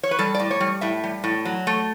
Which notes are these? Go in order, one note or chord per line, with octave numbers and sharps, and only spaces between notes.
C#5
B4
G3 A4
A2 D5
C#5
G3
A2 E5
G3
A2
F#3
A3